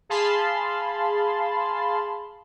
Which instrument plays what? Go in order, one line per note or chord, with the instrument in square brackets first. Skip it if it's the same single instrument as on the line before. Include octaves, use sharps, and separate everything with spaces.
[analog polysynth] G#4 F5 A5 B5 C6